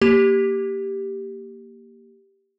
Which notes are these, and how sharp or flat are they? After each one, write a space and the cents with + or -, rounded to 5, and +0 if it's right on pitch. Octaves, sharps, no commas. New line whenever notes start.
A#3 +0 G4 +0